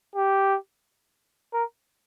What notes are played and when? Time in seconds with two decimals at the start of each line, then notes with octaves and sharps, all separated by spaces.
0.16 G4
1.53 A#4